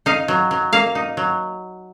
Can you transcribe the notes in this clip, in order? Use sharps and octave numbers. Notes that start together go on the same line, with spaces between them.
D#4 F5
F#3
F#3
A#3 F5
D#4
F#3